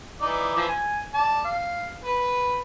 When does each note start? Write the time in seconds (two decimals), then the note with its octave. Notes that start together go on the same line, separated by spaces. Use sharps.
0.21 E3 D#4 D5
0.56 E3 F3
0.68 G#5
1.14 D5 A5
1.45 F5
2.04 B4